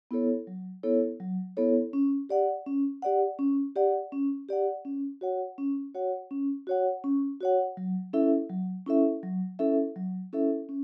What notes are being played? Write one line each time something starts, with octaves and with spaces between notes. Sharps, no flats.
B3 E4 A4 C#5
F#3
B3 E4 A4 C#5
F#3
B3 E4 A4 C#5
C#4
G4 D5 F#5
C#4
G4 D5 F#5
C#4
G4 D5 F#5
C#4
G4 D5 F#5
C#4
F#4 C#5 F#5
C#4
F#4 C#5 F#5
C#4
F#4 C#5 F#5
C#4
F#4 C#5 F#5
F#3
C#4 E4 A4 E5
F#3
C#4 E4 A4 E5
F#3
C#4 E4 A4 E5
F#3
C#4 E4 A4 E5
C#4